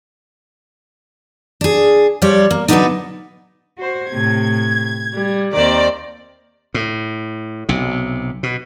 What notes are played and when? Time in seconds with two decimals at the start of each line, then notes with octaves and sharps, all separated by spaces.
1.61 D4 G#4
2.22 F3 G3 C#5 D5
2.51 A#3
2.68 D3 F#3 A#3 B3 D4 D#4
3.77 F#4 C5
4.09 A2 C3 G#6
5.13 G3
5.53 D#2 D#3 C4 D5 A#5
6.74 A2
7.69 B1 C3
8.43 B2